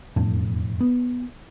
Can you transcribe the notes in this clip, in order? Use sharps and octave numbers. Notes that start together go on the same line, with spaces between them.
E1 F2 A2
B3